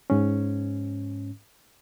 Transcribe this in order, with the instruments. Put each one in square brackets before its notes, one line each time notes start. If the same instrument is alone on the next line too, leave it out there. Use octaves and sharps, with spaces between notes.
[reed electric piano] G#2 C#4